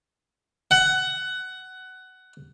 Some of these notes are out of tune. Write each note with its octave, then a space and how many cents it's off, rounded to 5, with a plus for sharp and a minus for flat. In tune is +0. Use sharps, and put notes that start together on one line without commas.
F#5 +15